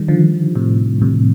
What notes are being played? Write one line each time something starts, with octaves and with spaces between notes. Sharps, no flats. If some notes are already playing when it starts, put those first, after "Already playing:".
Already playing: D#3 G3
D3 F3
A2 C3
A2 C3